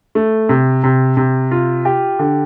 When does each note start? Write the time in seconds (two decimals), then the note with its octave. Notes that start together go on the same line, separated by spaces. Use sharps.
0.15 A3
0.49 C3
0.84 C3
1.17 C3
1.51 F4
1.85 G4
2.19 D3